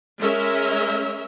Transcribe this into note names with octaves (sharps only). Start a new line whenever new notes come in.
G#3 C#4 A#4 E5